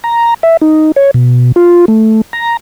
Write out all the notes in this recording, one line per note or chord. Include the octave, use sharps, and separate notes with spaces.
A#5
E5
D#4
C#5
B2
F4
A3
A#5